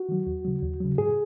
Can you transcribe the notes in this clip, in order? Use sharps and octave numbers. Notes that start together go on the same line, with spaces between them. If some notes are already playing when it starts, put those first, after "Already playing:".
Already playing: F#4
D#3 F#3
D#2
C#3 F#3
D#2
C#3 F#3
G#2 G#4